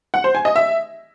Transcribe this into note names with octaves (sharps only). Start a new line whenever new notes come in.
F#5
C5
G#5
D#5
E5